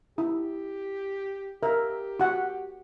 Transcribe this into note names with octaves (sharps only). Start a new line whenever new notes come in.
E4 G4
G4 A#4 E5
F#4 F#5